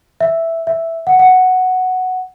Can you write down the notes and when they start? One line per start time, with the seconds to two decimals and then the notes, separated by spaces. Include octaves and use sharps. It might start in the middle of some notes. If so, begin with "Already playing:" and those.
0.21 E5
0.67 E5
1.07 F#5
1.19 F#5